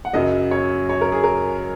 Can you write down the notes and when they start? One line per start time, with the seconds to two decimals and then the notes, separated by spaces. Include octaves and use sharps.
0.05 F#5
0.13 F#2 C#3 F#3 D#5
0.51 C#5
0.89 C#5
1.01 A#4
1.12 G#4
1.24 A#4